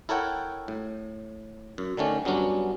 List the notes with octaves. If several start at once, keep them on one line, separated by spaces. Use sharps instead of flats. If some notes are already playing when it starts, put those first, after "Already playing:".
E4 A4 A#4 C#5 F#5 G5
A2
F#2
D3 D#3 A3 C#4 D4
G2 F#3 B3 C#4 D4